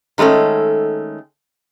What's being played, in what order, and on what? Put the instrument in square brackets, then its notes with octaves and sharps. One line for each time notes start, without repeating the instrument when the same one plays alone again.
[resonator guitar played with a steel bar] D#3 G#3 A3 C#4 A4